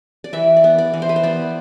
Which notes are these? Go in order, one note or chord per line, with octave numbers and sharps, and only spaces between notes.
D5
E3 E5
D5
B3
D5
E3
C5
B4
C5
B3 D5